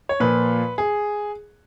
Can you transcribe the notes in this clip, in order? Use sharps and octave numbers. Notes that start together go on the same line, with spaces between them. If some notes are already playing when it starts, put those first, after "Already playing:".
C#5
A#2 F3 B4
G#4